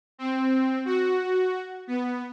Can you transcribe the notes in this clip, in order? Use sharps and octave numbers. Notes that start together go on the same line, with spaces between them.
C4
F#4
B3